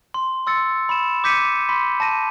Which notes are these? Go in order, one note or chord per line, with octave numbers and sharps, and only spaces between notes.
C6
C6 E6 A6 C#7
B5 E7
D6 G6 B6 C#7 D#7
B5 C6 B6
A5 A#6 D#7